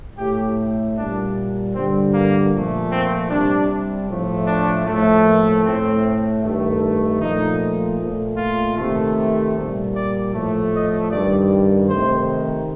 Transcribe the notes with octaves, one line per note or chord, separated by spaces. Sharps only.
A2 A3 G4
A#2 G3 D4
G2 D3 G3 C4
A#3
A#2 F3 A3
C4
C3 G3 D4
A2 F3 A3
D4
A2 F3 A3
A#3
A2 A3 C4
G2 D#3 A3
A#2 F3 A3 D#4
A#2 A3
F4
C3 D#3 A3
A#2 G3
D5
A2 F3 A3
D#5
G2 D#3 G3 D5
C3 D#3 A3 C5